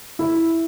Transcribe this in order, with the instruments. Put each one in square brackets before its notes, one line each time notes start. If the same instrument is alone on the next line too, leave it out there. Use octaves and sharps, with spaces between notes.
[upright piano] E4